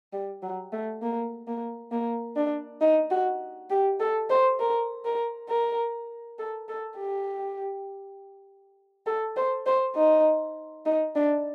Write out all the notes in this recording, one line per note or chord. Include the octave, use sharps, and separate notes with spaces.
G3
F#3
A3
A#3
A#3
A#3
D4
D#4
F#4
G4
A4
C5
A#4
A#4
A#4
A4
A4
G4
A4
C5
C5
D#4
D#4
D4